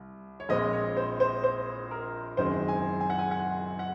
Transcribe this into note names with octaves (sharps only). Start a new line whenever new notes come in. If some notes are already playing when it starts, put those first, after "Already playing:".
Already playing: C2
C#5
A#1 A#2 G#3 C4 D#5
C#5
C5
C5
C5
A#4
F#1 F#2 D#3 G#3 C4 C5
G#5
G#5
F#5
G#5
F#5
F#5